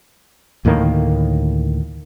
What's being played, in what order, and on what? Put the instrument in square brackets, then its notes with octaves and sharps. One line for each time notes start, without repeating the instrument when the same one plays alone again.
[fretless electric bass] D2 A2 D#3 A#3